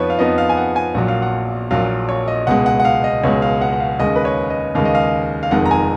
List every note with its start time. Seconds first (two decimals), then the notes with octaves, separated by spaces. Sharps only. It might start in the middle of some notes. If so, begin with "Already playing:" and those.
Already playing: F2 F3 B3 D#4 B4 C#5
0.10 F5
0.19 F2 F3 B3 D#4 D#5
0.38 F5
0.49 G#5
0.57 F#5
0.76 G#5
0.94 A#1 A#2 F#3 F#5
1.08 F5
1.22 F#5
1.71 A#1 A#2 F#3 F5
2.09 C#5
2.28 D#5
2.47 C#2 B2 G#3 F#5
2.66 F#5
2.80 F#5
2.85 F5
3.04 D#5
3.23 C#2 B2 G#3 C#5
3.42 F5
3.61 F#5
3.73 F#5
3.80 F5
3.99 D#2 C#3 G#3 D#5
4.16 B4
4.25 C#5
4.50 D#5
4.75 D#2 C#3 G#3 F5
4.85 D#5
4.95 F5
5.43 F5
5.51 F1 F2 D#3 G#3 F#5
5.66 A#5
5.71 G#5